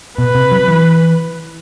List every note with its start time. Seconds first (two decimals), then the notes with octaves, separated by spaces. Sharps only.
0.18 B2 B4
0.35 C3
0.52 F#3
0.68 E3